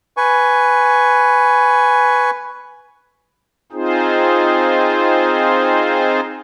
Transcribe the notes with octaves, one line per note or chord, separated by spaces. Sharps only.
B4 G#5 C#6
C4 D#4 F4 G#4 C5